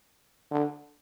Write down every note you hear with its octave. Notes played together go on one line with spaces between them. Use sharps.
D3